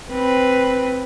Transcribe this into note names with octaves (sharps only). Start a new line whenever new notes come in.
C4 B4